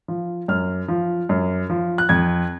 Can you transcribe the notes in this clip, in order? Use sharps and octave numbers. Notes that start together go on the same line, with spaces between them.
F3
F#2 F6
F3
F#2
F3
F#6
F2 G#6